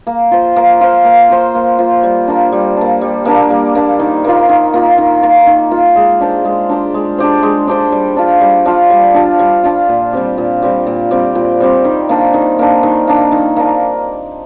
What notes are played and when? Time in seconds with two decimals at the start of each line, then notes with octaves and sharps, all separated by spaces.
0.07 A#3
0.31 F4 C5
0.56 A#3
0.81 F4 C5
1.05 A#3
1.30 F4 C5
1.55 A#3
1.78 F4 C5
2.03 G3
2.28 A#3 D4
2.52 G3
2.76 A#3 D4
3.01 G3
3.25 A#3 D4
3.50 G3
3.75 A#3 D4
3.99 D#3
4.24 A#3 F4
4.49 D#3
4.73 A#3 F4
4.98 D#3
5.22 A#3 F4
5.47 D#3
5.71 A#3 F4
5.96 G#3
6.21 D4 G4 C5
6.45 G#3
6.69 D4 G4 C5
6.94 G#3
7.18 D4 G4 C5
7.43 G#3
7.68 D4 G4 C5
7.92 G3
8.16 D4 F4
8.41 G3
8.65 D4 F4
8.90 G3
9.14 D4 F4
9.39 G3
9.64 D4 F4
9.89 A#2
10.13 G3 C4 G4
10.38 A#2
10.62 G3 C4 G4
10.86 A#2
11.11 G3 C4 G4
11.35 A#2
11.60 G3 C4 G4
11.85 D#3
12.09 A#3 D4
12.34 D#3
12.59 A#3 D4
12.83 D#3
13.07 A#3 D4
13.32 D#3
13.56 A#3 D4